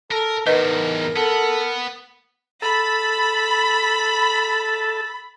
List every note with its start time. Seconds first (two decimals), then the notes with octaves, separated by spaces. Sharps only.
0.12 A4 A#4
0.47 E2 A2 D#4 A#4 B4 D#5
1.16 B3 A4
2.62 A4 B5